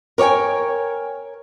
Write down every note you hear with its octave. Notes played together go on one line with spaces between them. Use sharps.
A#4 C#5 D5 G5 G#5